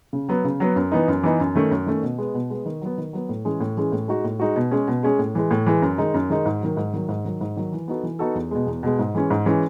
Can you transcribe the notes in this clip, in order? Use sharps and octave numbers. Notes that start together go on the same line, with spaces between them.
C#3
F#3 B3
C#3
F#3 B3
F#2
E3 B3 D#4
F#2
E3 B3 D#4
F#2
D#3 A3 C#4
F#2
D#3 A3 C#4
B2
G#3 B3
B2
G#3 B3
D#3
F#3 B3
D#3
F#3 B3
A2
E3 G#3 C#4 G#4
A2
E3 G#3 C#4 G#4
A2
G#3 D#4 F#4
A2
G#3 D#4 F#4
B2
G#3 C#4 G#4
B2
G#3 C#4 G#4
A2
E3 G#3
A2
E3 G#3
F#2
D#3 G#3 D#4
F#2
D#3 G#3 D#4
G#2
D#3 F#3
G#2
D#3 F#3
G#2
D#3 F#3
G#2
D#3 F#3
E3
B3 D#4 F#4 A4
E3
B3 D#4 F#4 A4
E2
B2 G#3
E2
B2 G#3
G#2
E3 G#3 C#4
G#2
E3 G#3 C#4